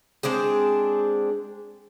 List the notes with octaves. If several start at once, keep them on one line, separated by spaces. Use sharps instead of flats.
G#3 C4 D4 G#4